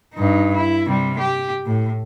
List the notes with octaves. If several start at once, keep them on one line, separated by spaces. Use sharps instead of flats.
G2 D#4
E4
C3 G3
G4
A2